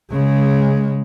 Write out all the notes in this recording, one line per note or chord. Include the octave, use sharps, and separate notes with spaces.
C#3 G#3